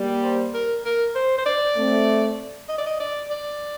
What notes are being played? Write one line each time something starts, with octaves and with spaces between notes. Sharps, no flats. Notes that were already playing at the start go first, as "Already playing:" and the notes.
Already playing: G3 A#3
C5
A#4
A#4
C5
C5
D5
A3 C4
D#5
D5
D#5
D5
D5